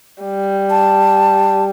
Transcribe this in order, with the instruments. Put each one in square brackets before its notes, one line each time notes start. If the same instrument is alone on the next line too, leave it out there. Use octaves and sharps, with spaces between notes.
[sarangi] G3
[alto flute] A5